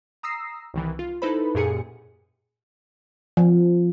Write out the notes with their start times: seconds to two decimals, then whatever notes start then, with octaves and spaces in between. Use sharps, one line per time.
0.23 A#5 D#6 E6 A#6 C7
0.74 C2 D#3 E3
0.99 F4
1.22 D#4 E4 A4 B4 C5 B5
1.55 F#2 A#2 G4 G#4 G#5 C#7
3.37 F3